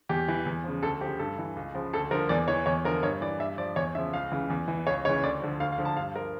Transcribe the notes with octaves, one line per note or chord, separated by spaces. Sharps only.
E2 G4
E3
E2
C#3 F3
D2 A4
C#3 F3 G4
G2 A4
E3
C#2
C#3 F3
D2 A4
D3 F3 A#4
E2 D5
E3 C#5
E2 C#5
D3 F3 A#4
G2 C#5
E3 D5
G2 E5
F3 D5
E2 C#5
C#3 F3 E5
C#2 F5
C#3 E3
E2
E3
C#2 C#5
C#3 E3 C#5
D2 D5
D3 F3
D2 F5
F5
D3 F3
A5
G2 F5
F3 A#4